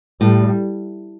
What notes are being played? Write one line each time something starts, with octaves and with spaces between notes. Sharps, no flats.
A2 G3